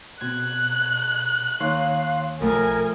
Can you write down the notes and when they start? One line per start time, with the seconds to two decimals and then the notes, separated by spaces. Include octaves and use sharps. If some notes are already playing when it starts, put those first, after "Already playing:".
0.21 B2 C4 F#6 G#6
1.60 D#2 D#3 C#5 F5 C6
2.41 B1 F2 A3 D#4 A#4 G#5